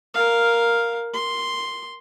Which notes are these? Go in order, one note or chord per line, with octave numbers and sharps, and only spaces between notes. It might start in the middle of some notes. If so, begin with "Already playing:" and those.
A#4 F5
C6